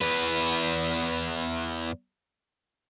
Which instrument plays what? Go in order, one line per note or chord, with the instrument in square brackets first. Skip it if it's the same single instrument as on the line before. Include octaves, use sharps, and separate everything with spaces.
[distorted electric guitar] E2 B4